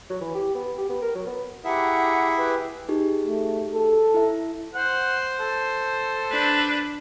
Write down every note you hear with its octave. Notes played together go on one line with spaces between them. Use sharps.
F#3
E3
G4
B3
G4
B3
A#4
F#3
B3
E4 G4 G#4 E5 F#5 A#5
G4 B4
D#4 G4 G#4
A3
A4
E4 E5
C5 F#5
A4
D4 B4